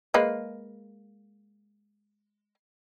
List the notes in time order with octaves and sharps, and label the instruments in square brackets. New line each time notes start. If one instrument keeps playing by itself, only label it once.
[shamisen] G#3 A#3 B4